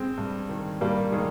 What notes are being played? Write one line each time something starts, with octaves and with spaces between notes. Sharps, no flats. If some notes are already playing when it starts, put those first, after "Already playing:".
Already playing: G#3 C4
G2
D#3
G2 G3 A#3
D#3 G#3